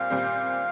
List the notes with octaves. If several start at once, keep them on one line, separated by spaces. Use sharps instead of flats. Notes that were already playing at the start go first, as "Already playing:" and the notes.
Already playing: A#2 G3 C4 F5
A#2 G3 C4